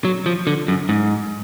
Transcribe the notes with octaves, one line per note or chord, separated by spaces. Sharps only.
F#3
F3
D3
F#2
G#2